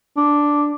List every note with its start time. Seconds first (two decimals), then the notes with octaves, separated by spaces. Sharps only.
0.17 D4